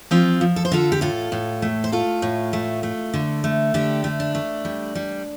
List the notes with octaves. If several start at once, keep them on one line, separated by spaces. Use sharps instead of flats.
F3 C4 F4
F3
A4
C5
D3 F4 A4
G4
A2 F4 A4
A2
A3
C5
A3 F4 A4
A2
A3
A3
D3
A3
D3 D4 G4
A3
D4
A3
G3
G3